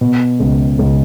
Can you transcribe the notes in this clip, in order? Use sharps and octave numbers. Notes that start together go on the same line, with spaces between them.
B2
C#2
C#2